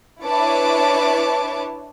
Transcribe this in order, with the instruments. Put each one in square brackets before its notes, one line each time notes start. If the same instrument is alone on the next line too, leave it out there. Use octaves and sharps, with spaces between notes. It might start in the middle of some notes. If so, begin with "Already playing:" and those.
[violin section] D4 E4 B4 C#5 A5 D6